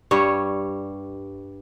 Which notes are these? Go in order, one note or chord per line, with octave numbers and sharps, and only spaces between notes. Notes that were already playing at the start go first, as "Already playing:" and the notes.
G2 G3 C#5